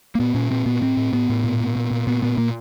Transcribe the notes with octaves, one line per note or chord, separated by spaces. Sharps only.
A#3
A#2 B3
A#2 C#4
A#2 C4
A#2 B3
A2 C4
A2
A2 B3
A2
A#2
A#2
A#2
A#2
A#2 B3
A#2 B3
A#2 A#3